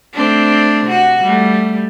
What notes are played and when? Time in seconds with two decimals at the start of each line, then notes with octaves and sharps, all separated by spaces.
0.13 A3 C4 D4
0.85 C3 F#4
1.22 G3 A3